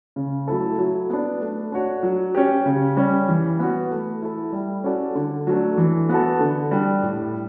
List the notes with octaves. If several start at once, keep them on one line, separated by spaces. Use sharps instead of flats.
C#3
F#3 A3 E4 A4
F#3
B3 D4
A3
D4 F#4 C#5
F#3
C#4 G4
C#3
G3 C#4
E3
B3 F#4
A3
E4 A4
G3
C#4 F#4 A4 D5
D3
F#3 A3 D4
E3
B3 F#4 A4
D3
G3 D4
A2